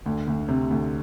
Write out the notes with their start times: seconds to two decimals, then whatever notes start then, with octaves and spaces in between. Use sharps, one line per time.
0.06 D2
0.27 D2
0.48 C3
0.71 D2